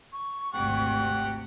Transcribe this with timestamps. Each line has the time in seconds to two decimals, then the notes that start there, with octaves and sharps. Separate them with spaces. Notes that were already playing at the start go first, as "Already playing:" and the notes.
0.13 C#6
0.53 G#1 D2 C3 G4 F#5